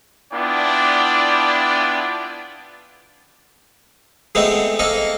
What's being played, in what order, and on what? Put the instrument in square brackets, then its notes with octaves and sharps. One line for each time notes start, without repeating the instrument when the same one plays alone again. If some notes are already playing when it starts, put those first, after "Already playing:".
[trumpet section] B3 D4 E4 F4 D5 G5
[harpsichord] G#3 A3 B3 C4 D#4
A#3 C4 A4 D#5